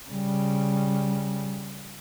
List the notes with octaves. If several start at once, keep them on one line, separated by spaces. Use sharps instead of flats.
C#3 G3